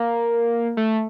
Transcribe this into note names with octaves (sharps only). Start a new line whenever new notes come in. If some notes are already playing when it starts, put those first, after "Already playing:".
Already playing: A#3
A3